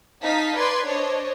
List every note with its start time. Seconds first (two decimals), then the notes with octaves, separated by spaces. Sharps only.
0.23 D#4 F5 A5 B6
0.58 B4 D5 C6 G#6
0.87 D4 C5 C#5 D#5